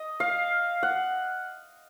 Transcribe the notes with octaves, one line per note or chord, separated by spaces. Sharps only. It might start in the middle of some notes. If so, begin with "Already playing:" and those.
Already playing: D#5
F5
F#5